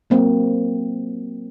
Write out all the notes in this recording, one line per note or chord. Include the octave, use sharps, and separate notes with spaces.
F#3 A#3 C4